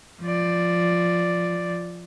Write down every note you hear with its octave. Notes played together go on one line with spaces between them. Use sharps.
F3 D5